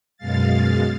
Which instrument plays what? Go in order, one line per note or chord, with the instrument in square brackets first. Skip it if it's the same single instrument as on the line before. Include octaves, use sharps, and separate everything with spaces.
[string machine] F#2 B2 G#3 F5 A6